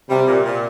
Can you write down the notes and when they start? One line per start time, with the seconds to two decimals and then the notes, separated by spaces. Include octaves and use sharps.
0.10 C3 G3
0.27 A#2
0.45 A#2